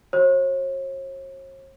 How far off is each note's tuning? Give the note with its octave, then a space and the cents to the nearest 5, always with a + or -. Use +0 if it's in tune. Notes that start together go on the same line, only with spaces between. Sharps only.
F#4 +0 C#5 -45